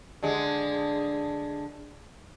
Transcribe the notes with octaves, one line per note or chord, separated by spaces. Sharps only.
D3 G#3